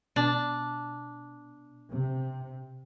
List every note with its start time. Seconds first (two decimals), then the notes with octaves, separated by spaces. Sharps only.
0.16 B2 D4
1.91 C3